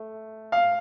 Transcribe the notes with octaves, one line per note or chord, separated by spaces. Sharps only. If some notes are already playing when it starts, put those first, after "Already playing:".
Already playing: A3
F5